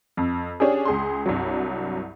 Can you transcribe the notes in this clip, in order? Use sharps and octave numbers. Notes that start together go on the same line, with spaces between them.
F2
C#4 D4 G4 G#4
C#2 G#4 C6
C2 G2 F#3